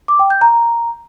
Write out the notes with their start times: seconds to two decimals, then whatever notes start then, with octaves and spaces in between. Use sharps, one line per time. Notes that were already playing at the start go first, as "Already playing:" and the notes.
0.08 D6
0.19 G5
0.30 G6
0.41 A#5